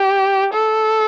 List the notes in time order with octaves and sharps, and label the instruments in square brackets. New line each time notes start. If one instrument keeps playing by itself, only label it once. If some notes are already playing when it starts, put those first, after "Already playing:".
Already playing: [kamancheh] G4
A4